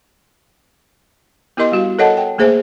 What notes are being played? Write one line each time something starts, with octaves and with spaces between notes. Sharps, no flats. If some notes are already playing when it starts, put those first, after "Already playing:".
B3 E4 G4 A#4 D#5 C6
G3 F#4 F5
A4 A#4 C#5 D#5 F#5 A5
G5
A3 A#3 G#4 C5 E5 G#5